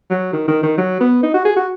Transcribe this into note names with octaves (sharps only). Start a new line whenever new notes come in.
F#3
D#3
D#3
D#3
F#3
B3
D#4
F#4
G#4
F#4